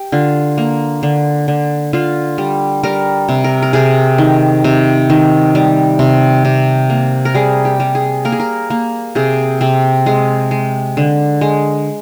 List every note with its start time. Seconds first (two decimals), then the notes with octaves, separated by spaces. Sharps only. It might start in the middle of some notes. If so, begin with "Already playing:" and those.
Already playing: G4
0.12 D3 F4
0.58 A#3
1.03 D3
1.48 D3
1.93 D3 F4
2.38 G3
2.83 G3 A#4
3.29 C3
3.44 A#4
3.62 A#4
3.73 C3 G#4
4.18 D#3
4.64 C3
5.10 D#3
5.55 G3
5.99 C3
6.45 C3
6.90 A#3
7.25 A#4
7.35 G3 G#4
7.65 G4
7.80 G3
7.95 G#4
8.25 A#3 A#4
8.32 G#4
8.40 A#4
8.70 A#3
9.15 C3 G#4
9.61 C3 C4
10.06 G#3 G#4
10.51 G#3
10.97 D3
11.41 G#3